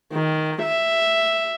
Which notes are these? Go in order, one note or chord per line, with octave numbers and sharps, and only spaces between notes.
D#3
E5